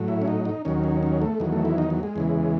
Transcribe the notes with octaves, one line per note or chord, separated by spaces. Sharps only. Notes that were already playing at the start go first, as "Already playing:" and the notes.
Already playing: A2 F#3
E4
C#4
D#4
D#4
D#2 D#3 F#3 C#4
C#4
C#4
A3
E2 D#3 F#3
A3
E4
D#4
F#3
G#3
E2 C#3 E3